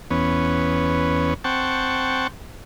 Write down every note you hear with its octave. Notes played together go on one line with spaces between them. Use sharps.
E2 B3 C#4
C4 F#5 G5 A5 C#6